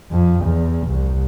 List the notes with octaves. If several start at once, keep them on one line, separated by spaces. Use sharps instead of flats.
F2
E2
C2